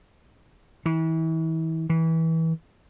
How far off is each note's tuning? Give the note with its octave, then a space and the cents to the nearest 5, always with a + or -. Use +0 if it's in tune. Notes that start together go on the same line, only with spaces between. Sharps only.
E3 -35
E3 -25